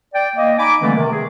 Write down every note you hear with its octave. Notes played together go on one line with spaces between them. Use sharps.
D5 G5
A#3 D#5
D#4 G#5 B5 D6
D3 E3 G3 A3 A#3 C4
C3 D#3
G#4